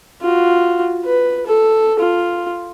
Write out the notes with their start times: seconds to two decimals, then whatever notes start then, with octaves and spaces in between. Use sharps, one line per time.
0.21 F4 F#4
1.05 B4
1.46 A4
2.00 F4